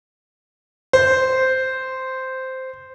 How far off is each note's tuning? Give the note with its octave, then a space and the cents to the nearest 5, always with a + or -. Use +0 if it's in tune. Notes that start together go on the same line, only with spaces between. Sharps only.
C5 -5